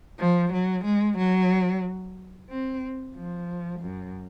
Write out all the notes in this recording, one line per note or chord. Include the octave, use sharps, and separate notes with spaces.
F3
F#3
G#3
F#3
C4
F3
F#2